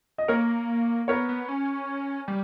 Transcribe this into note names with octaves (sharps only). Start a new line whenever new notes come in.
D#5
A#3 A#4 C#5
B3 A#4 C#5
B3
C#4
G3